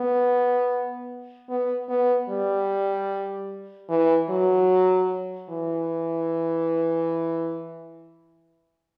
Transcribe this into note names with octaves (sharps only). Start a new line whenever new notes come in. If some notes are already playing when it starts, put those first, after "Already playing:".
Already playing: B3
B3
B3
G3
E3
F#3
E3